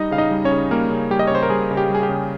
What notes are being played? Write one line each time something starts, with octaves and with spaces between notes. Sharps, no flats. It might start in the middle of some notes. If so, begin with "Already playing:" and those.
Already playing: G3 D#4 D#5
C#3 F5
D#4 D#5
G3
C#4 C#5
C#3
G3 A#3 A#4
C#3
G3 G4
D#5
C#5
C#3 C5
A#4
G3 G#4
C#3
G4
G3 G#4
G4
C#3